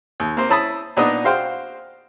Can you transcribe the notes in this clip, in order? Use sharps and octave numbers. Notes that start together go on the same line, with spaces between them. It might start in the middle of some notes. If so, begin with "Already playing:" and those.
D#2
A#3 C4 C5
C#4 E4 A5 B5 D#6
A#2 B3 D4 D#4 D#5
F#4 C5 F5 G5 C6